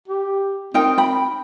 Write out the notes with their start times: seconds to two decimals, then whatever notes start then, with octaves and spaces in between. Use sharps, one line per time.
0.08 G4
0.74 C4 D#4 A#4 G5
0.98 G5 B5